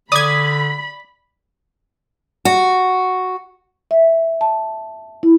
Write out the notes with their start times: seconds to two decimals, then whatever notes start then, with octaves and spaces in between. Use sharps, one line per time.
0.12 D3 D5 B5 D#6 G#6
2.45 F#4
3.91 E5
4.41 A5
5.23 E4